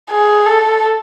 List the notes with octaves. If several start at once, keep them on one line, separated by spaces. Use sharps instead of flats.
G#4
A4